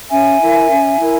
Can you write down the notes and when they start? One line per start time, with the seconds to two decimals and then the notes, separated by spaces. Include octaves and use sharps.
0.11 C#4 E5 G#5
0.41 E4 A#4
0.70 C#4
1.00 E4 A#4